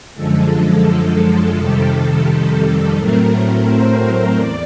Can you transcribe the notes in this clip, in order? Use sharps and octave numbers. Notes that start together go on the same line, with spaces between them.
F#2 D3 F3 G#3 A4
F2 C3 D#3 G3 A4
A2 F#3 A3 C4 A#4
C5
E2 D5